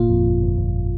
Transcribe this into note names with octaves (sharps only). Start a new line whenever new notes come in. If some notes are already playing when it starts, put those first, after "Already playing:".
Already playing: G1 A#2 F4
F2
G1
G1
G1